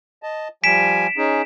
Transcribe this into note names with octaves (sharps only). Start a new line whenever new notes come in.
D#5 A5
F3 G3 G#5 B6 D7 E7
C#4 D#4 G#4